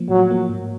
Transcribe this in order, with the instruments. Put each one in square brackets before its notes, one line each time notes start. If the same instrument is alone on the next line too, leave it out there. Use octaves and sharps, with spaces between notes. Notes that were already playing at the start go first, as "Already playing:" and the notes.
Already playing: [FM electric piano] F3 A#3
[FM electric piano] A2 [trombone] F#3
[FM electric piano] F3 A#3
G#2